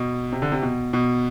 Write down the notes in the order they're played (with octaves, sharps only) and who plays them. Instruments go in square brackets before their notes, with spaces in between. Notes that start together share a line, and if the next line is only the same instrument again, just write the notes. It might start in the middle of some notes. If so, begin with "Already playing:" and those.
Already playing: [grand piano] B2
C3
D3
C3
B2
B2